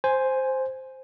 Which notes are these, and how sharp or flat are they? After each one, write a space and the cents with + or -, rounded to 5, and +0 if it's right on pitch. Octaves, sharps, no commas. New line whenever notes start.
C5 +0 G#5 +0